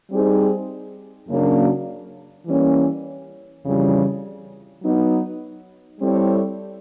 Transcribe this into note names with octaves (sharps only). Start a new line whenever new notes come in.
G3 C4 D#4 G#4 C5
F#2 C#3 F#3 A#3 D4
E3 G3 A#3 C#4
F2 C#3 E3 G3
F#3 B3 D#4
G3 C4 E4 A4 C#5